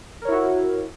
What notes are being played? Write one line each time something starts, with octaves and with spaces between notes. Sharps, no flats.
E4 F#4 A#4 C#5